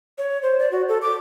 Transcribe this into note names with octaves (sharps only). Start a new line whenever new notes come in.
C#5
C5
D5
F#4
A4
D6